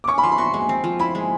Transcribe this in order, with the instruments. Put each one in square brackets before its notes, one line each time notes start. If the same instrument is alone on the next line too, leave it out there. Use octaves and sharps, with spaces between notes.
[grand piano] D6
[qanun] C#4 [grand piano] C#6
[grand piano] B5
[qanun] F3 [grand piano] C6
[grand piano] B5
[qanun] F#4 [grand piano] C6
[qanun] G#3
C4
F3
[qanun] E4 [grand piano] B5
[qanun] G#3